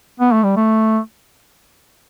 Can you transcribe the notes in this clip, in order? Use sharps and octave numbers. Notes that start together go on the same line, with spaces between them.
B3
A3
G3
A3